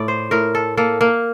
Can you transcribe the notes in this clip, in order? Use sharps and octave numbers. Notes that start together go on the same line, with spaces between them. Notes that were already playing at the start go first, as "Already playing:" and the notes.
Already playing: A2 D5
C5
A2 A#4
A4
A#3 A4
A#3